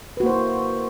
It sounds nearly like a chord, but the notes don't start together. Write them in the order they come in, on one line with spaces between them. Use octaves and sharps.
B4 F#4 A#3 C5 E4